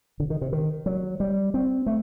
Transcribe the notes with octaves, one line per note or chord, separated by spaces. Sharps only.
D3
D#3
C3
D#3
F#3
G3
C4
A3